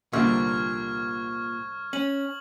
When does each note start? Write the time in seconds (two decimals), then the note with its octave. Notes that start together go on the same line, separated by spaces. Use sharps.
0.13 C2 A#2 D3 E5 C#6 F6 G#6
1.93 C#4 F#7